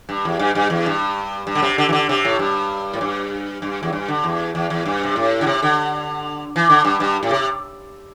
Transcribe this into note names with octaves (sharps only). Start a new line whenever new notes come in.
G2
E2
G2
G2
E2
G2
G2
D3
C3
D3
E3
D3
C3
A2
G2
A2
G2
G2
E2
G2
D3
E2
E2
E2
G2
C3
A2
D3
C3
D3
E3
D3
G2
G2
A2
C3